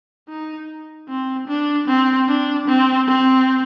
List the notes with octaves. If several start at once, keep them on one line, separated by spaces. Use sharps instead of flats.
D#4
C4
D4
C4
D4
C4
C4